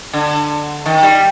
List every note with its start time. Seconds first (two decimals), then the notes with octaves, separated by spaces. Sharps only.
0.13 D3
0.86 D#3
1.03 G3